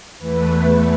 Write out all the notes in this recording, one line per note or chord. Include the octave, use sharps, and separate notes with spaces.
E2 E3 A3 B4